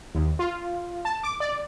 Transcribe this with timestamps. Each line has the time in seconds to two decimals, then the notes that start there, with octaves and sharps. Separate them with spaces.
0.15 D#2
0.39 F4
1.05 A5
1.23 D6
1.40 D5